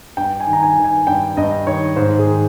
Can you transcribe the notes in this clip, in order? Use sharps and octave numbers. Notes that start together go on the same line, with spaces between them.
G2 G5
G#5
D#3
A#5
G#5
D#3
G#5
G2 G5
G2 D#5
D#3 C#5
G#2 C5
G#4
D#3